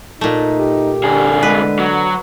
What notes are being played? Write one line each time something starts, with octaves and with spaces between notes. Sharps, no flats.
A#2 A3 D#4
G4
C2 D3 G#4
G#3 B4
F#3